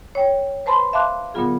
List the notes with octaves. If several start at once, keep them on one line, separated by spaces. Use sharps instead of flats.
C#5 G5
B4 C5 A5 B5 C6
E5 F5 A5 C6 D6 F#6
A#2 D3 F#3 B3 F4 G#4